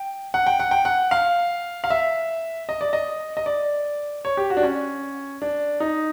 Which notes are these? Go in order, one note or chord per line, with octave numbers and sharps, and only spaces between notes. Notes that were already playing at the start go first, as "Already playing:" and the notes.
Already playing: G5
F#5
G5
F#5
G5
F#5
F5
F5
E5
D#5
D5
D#5
D#5
D5
C#5
G4
F#4
D4
C#4
D4
D#4